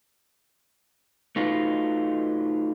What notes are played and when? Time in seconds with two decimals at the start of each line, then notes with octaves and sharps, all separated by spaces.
1.36 A3 D#4 F4 F#4 B4